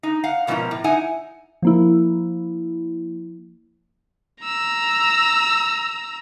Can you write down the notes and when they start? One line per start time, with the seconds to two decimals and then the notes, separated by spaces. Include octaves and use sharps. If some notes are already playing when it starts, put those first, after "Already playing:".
0.03 D#4
0.24 F5 F#5
0.47 G#2 B2 F3 A#3 C#4 E4
0.71 A2
0.84 D#4 E4 F#5 G#5
1.62 F3 A#3 E4
4.44 A#5 E6